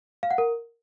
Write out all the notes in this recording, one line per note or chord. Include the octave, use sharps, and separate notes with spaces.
F5
F#5
A#4